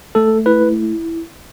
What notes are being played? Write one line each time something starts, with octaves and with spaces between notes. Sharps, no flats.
A3 A4
E4 B4